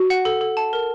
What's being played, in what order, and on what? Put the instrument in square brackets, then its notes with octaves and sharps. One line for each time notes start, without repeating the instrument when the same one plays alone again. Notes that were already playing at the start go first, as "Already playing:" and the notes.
Already playing: [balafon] F#4
[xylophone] F#5
A4
A4
A5
A#4